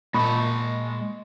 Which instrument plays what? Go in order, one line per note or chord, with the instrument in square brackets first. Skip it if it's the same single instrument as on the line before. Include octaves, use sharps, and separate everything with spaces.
[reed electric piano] A#2 D#5 C#6 [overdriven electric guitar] G#3 A5 [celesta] B5